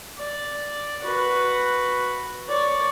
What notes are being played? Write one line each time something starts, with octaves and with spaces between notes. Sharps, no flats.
D5
F#4 B4
C#5 D5